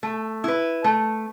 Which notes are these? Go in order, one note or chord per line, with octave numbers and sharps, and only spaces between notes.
A3
E4 B4
A3